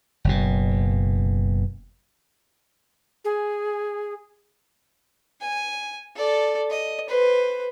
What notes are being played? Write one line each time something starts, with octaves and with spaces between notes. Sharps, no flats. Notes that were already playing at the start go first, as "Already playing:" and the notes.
F#1 B2
G#4
G#5
A4 D5
D#5
B4 C5